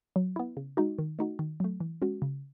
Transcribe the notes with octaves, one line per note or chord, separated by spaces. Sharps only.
F#3
B3 E4
C#3
G#3 D#4 F#4
D#3
A3 D#4 F#4
D#3
F#3 A3
E3
G#3 C#4 F#4
C#3